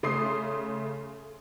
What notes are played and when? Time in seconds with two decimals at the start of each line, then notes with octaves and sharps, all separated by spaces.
0.03 C#3 A3 C6 D#6 C7